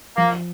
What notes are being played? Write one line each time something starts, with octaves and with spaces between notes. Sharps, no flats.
F3 A#3